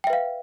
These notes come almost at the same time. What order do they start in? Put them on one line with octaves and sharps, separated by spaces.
G5 E5 B4 F5